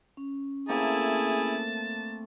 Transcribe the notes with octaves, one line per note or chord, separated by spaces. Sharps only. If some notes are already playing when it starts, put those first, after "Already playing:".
C#4
A3 A#3 C4 E4 G#4 A5